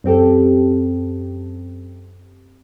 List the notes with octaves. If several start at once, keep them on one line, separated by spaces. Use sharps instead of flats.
F#2 C4 G4 A4